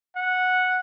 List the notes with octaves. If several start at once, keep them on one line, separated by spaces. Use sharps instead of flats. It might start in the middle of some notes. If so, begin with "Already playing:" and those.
F#5